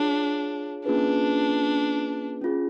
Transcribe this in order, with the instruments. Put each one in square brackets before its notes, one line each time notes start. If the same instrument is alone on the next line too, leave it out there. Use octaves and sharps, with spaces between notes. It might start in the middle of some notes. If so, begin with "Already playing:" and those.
Already playing: [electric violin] D4 [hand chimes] F4 G#4 C#5 F5
[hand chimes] A#3 C#4 F4 G#4 B4 [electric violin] D4
[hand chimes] C#4 F4 G#4